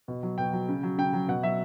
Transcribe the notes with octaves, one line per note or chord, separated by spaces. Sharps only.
B2
F#3
B2 G5
F#3
C#3
F#3
C#3 G5
F#3
B2 F#5
F#3 E5